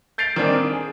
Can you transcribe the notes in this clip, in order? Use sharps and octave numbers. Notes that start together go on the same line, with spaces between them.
G6 A6 C7 D7 F7
D#3 E3 A#3 C4 D4
D#6
G#4